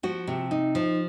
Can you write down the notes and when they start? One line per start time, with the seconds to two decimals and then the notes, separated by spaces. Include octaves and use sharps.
0.03 F3 F#4
0.27 C3
0.51 D#4
0.75 F3